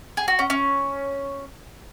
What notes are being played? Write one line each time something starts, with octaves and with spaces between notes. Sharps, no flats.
G#4
F#4
C#4
C#4